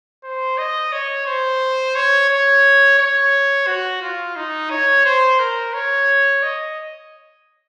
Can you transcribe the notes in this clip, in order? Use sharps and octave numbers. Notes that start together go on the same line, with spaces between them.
C5
D#5
C#5
C5
C#5
C#5
C#5
F#4
F4
D#4
C#5
C5
A#4
C#5
D#5